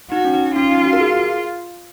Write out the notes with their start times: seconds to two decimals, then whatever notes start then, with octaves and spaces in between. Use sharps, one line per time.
0.11 D#4 F#4
0.25 C#4
0.34 D#4
0.56 C#4 F4
0.71 D#4
0.85 F#4
0.93 A#4
1.00 G#4